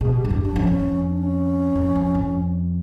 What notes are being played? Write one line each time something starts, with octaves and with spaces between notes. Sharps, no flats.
B2 G#4
G4
G2
F#2 G4
F#2 D4
F2 C#4
E2
F2
D4
C#4
F2
F2
F2